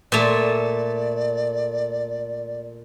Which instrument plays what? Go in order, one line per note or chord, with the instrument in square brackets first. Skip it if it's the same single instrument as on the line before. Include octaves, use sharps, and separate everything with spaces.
[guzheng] A#2 A3 [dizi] D5